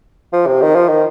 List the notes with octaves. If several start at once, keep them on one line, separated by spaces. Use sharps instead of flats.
F3
C3
D#3
F3
D#3